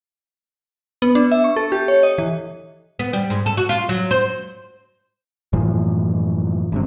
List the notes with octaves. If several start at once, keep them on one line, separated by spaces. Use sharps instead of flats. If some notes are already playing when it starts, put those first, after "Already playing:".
B3
D4
E5
C#6
A4
G4
C#5
D#5
E3
B3
G3
G#2
A4
F#4
F4
F#3
C5
F#2 A2 E3 F3
G#1 G2 C3